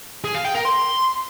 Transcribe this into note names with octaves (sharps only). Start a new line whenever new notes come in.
G#4
F5
G5
A#4
C6